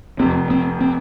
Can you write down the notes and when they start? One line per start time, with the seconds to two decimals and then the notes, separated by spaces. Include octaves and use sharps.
0.19 F1 F2 C3 C4
0.50 C4
0.81 C4